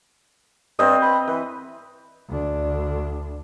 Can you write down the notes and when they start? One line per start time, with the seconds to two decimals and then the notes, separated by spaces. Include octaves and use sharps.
0.79 G2 C4 C5 D#5
1.02 B4
1.28 E3 B4
2.29 D2 D4